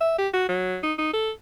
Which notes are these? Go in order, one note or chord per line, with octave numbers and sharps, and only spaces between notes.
E5
G4
F#4
F#3
D#4
D#4
A4